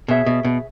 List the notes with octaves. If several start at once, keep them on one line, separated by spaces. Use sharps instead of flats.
B2 G#4 C#5 E5
B2
B2